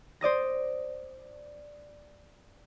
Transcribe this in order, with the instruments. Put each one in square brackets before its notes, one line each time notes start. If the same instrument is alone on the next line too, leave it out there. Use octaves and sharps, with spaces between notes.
[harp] C5 D5 D#6 A#6